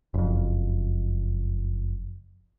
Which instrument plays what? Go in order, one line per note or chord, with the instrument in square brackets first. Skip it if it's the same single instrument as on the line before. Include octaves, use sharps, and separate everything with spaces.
[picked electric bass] F#1 F2